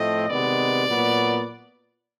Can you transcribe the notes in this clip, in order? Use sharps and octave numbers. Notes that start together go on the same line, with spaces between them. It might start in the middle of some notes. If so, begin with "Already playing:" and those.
Already playing: A2 F3 A3 C4 D#5
C3 D#3 G#3 B3 D5
A#2 F#3 B3